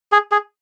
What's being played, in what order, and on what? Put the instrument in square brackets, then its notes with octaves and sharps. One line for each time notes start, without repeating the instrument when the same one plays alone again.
[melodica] G#4
G#4